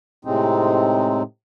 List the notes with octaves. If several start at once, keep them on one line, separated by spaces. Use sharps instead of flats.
A2 C3 G#3 C4 D#4